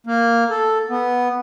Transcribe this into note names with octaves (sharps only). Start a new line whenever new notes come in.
A#3
A4
B3